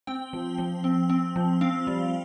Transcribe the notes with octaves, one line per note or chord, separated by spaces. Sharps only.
C4 G5
F3
F3
C4
C4
F3
C4 F5
G3